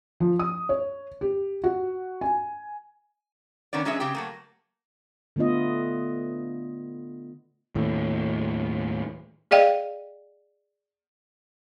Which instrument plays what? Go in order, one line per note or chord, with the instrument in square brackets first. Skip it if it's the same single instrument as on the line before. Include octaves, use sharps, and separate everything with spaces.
[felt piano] F3
D#6
C#5
G4
F#4
G#5
[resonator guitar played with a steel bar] D#3 B3 C#4 D5
F#3 G#3 C#4 D#4 G#4 E5
C#3 C4 G4 G5
F#3 A3 A#3
[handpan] D3 A3 B3 F4 D#5
[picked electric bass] D#2 A2
[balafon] G#4 D5 D#5 F5 G5